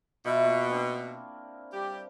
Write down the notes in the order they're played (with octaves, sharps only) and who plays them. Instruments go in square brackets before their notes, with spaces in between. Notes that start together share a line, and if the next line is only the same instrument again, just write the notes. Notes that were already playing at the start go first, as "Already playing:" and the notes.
[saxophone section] B2 [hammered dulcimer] E4 F4 E5
[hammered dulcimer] A#3 B5 C#6
C4 D4
[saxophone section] G3 G4